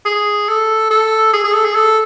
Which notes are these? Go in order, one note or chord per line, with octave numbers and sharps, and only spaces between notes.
G#4
A4
A4
G#4
G#4
A4
G#4
A4